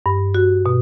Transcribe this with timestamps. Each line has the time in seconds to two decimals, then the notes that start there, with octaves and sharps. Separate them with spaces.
0.06 G2
0.35 F#4
0.66 B2